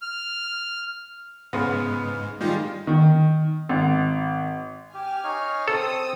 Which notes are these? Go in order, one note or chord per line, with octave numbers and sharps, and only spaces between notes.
F6
G#2 C#3 B3
D#3 G3 G#3 F4
D#3
G#1
G4 G#5 F6
D#4 C#5 F5
C4 A4 C5 D#6 E6